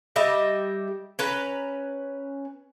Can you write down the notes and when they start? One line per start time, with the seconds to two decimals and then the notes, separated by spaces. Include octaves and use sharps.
0.16 G3 G4 D#5 E5
1.19 C#4 B4 A#5